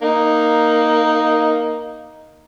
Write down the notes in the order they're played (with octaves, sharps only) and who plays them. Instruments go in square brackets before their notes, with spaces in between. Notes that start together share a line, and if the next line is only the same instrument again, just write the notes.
[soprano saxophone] A#3 [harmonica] D#4